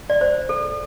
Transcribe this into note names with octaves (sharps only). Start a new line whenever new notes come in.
D5
C5
A4